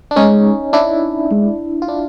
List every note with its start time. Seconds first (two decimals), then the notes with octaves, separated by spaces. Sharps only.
0.11 D4
0.16 G#3 C#4 D#4
0.73 D4 E4
1.31 G#3
1.82 F4
1.88 D4 E4